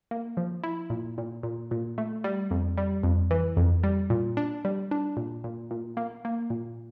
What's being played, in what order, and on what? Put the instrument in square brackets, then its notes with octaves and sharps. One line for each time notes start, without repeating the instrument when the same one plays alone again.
[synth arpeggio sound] A#3
F3
E4
A#2
A#2
A#2
A#2
A3
G3
F2
G3
F2
E3
F2
G3
A#2
D4
G3
D4
A#2
A#2
A#2
A#3
A#3
A#2